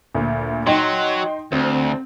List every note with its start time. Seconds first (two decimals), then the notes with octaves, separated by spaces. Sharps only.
0.15 D2 A#2
0.67 F#3 D#4 G5 C6
1.52 D2 C4